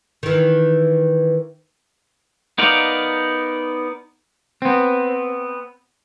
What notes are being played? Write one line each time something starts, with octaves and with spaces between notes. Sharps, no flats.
D#3 E3
B3 D#4 A#4 D5 F5
B3 C4